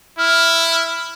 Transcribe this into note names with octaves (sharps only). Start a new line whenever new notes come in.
E4 F6